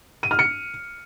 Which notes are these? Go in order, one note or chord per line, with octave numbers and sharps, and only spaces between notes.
D#7
F6
C#7